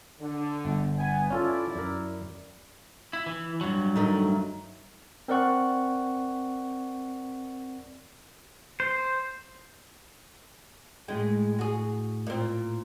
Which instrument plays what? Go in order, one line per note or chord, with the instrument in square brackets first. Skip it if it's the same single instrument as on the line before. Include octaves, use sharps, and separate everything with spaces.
[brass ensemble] D3
[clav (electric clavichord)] G1
[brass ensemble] B3 G#5
[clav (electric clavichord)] C#4 F4 A4 [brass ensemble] E4 D5
[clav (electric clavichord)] F#2 A#4
[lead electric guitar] E4
E3
G2 F#3
[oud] D#3 A3 D#4
[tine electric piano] C4 A#4 D5 F#5 C#6 F#6
[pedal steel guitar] C5
[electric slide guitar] A2 D#4 G5 [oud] G#3
[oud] F#4 G#4
A#2 C4